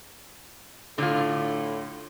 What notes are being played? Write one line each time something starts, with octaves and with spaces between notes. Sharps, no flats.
A2 D3 F4